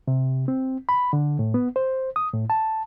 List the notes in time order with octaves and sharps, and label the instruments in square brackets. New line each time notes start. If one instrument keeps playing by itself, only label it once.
[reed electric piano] C3
C4
B5
D3
A2
B3
C5
D#6
A2
A5